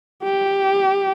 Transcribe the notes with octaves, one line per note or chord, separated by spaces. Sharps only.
G4